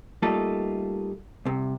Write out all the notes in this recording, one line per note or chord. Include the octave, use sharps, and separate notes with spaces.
G3 A3 A#3 D#4 F4 A4
C2 C3